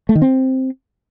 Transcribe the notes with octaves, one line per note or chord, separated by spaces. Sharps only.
A3
D#3
C4